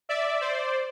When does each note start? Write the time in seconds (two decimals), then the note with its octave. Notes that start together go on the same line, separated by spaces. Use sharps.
0.09 D5 E5
0.41 C5 D5